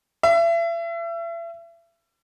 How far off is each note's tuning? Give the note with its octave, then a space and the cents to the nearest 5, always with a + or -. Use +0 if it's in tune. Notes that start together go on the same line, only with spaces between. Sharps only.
E5 +35